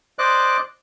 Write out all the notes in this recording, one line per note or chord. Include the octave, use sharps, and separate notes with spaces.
C5 D5 D#5 D6 F#6